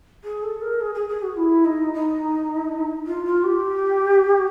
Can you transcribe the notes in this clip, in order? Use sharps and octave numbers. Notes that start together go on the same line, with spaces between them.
G#4
A4
A#4
G#4
G#4
G#4
F#4
E4
D#4
D#4
F4
F4
G4